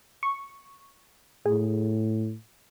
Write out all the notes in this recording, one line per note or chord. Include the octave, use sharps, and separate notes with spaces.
C#6
A2 G#4